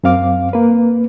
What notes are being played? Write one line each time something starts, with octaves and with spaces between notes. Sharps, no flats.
F#2 C4 F5 D6
A#3 B4